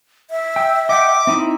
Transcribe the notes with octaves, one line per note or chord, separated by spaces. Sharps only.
E5
G5 E6
D#5 F#5 G5 D6
C4 D#4 E4